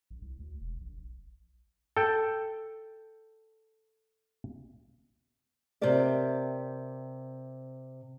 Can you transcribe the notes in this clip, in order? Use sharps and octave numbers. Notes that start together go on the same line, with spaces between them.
A#1
C2
D2
E1
A#1
A4 G5
C3 G4 A#4 D5 E5